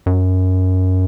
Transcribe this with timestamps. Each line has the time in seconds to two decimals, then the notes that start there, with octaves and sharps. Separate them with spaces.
0.06 F#2